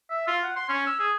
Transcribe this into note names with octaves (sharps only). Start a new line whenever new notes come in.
E5
F4
F#5
C6
C#4
E6
G#4